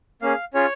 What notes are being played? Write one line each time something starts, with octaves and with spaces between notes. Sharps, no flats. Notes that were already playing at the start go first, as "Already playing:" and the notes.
A#3 C#4 G#4 F5
C#4 F4 G#4 C#5